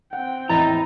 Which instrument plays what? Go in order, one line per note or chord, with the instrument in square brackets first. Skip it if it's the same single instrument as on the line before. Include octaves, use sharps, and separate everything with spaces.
[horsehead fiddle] C4 G5 [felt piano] F#5
[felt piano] A1 E2 A6 [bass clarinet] E4 [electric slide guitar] D#5 A#5